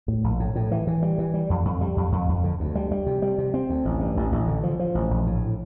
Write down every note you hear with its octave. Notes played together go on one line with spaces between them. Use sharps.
A2
A#1
A2
A2
E3
E3
G3
E3
G3
F2
F2
G3
F2
F2
F2
D3
D2
G3
G3
C3
G3
C3
C4
D2
A1
G2
A1
A1
D3
F3
F3
A1
A#1
A2